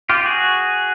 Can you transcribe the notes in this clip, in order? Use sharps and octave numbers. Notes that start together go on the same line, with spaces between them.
F4 G4
F#4 G#4